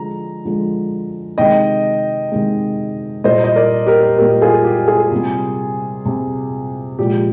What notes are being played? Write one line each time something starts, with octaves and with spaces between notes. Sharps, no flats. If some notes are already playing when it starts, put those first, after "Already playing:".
Already playing: D3 F3 G#3 A#5
D3 F3 G#3
C3 D#3 G#3 D#5 G5
C3 D#3 G#3
A#2 G3 C5 D#5
D#5
A#4 D5
G4 A#4
A#2 G3 G4 A#4
F4 G#4
G4
F4 G#4
C3 G3
C3 G3
A#2 F3 G#3 G4